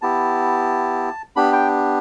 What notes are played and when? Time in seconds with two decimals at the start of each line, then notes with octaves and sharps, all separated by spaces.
0.02 B3 E4 G4 A5
1.36 B3 D4 G4 B5
1.53 G5